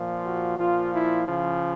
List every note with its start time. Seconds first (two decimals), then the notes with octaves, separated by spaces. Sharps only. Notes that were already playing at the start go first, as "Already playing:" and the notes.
Already playing: A#2 F3
0.24 F#4
0.58 A#2 F3 F4
0.93 E4
1.27 C#3 F3